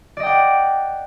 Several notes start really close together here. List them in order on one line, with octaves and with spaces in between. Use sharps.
D5 D#5 G5 F#5